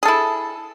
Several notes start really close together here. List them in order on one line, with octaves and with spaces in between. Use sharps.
G#4 A4 E4